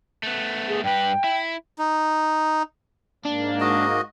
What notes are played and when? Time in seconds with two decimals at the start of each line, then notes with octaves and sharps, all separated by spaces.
0.23 A3 B3
0.68 G#4
0.84 G2 B4 G5
1.24 E4
1.79 D#4
3.25 G#2 A#3 D4
3.61 F#4 D#5